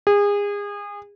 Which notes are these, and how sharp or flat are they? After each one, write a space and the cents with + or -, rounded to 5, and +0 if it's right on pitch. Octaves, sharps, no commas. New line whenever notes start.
G#4 -30